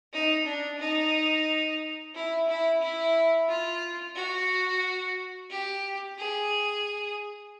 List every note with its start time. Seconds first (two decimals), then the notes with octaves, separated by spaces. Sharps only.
0.13 D#4
0.46 D4
0.80 D#4
2.15 E4
2.48 E4
2.82 E4
3.48 F4
4.16 F#4
5.50 G4
6.17 G#4